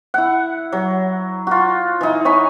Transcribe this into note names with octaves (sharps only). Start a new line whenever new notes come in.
E4 F#5
F#3
F4 F#4
E3 D#4
C#5 G#5 B5 C#6